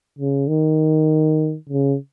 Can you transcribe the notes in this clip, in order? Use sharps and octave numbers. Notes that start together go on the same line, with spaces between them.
C#3
D#3
C#3